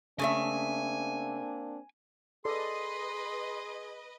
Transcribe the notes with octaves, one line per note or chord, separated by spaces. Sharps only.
C#3 A3 A#3 C4 D4 E5 G#5
G#4 A4 B4 D5 D#5 C6